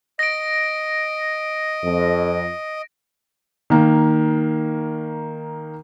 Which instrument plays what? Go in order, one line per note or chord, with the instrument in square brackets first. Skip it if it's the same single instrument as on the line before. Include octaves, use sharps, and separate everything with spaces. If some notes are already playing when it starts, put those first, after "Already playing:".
[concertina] D#5 [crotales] A#6 D7
[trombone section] F2
[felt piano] D#3 A#3